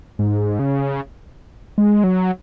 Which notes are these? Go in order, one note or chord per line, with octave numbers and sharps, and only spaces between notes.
G#2
C#3
G#3
F#3